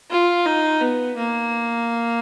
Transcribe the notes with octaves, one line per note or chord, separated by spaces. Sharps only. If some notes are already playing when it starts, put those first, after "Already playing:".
F4
D#4
B3
A#3